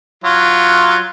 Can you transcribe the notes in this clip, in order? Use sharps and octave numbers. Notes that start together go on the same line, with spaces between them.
F#3 F4